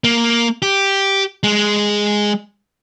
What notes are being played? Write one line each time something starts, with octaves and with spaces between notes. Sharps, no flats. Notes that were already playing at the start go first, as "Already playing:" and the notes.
A#3
G4
G#3